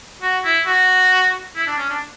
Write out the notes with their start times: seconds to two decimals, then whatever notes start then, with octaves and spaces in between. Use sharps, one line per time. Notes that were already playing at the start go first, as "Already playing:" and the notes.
0.22 F#4
0.44 E4
0.66 F#4
1.56 E4
1.67 D4
1.78 C#4
1.89 D4